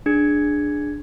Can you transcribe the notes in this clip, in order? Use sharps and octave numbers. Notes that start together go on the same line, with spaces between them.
D4 G#4 G#6 C#7